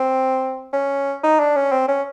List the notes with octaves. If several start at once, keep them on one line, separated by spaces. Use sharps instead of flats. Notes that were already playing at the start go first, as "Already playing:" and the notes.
Already playing: C4
C#4
D#4
D4
C#4
C4
C#4